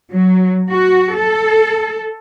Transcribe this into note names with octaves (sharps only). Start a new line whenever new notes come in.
F#3
F#4
A4